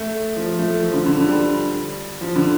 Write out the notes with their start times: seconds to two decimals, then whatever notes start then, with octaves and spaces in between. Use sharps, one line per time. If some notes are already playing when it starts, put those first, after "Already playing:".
Already playing: A3
0.36 F3
0.49 F3
0.59 A3
0.83 F3
0.94 D3
1.06 D3
1.18 D3
1.28 G3
2.21 F3
2.36 D3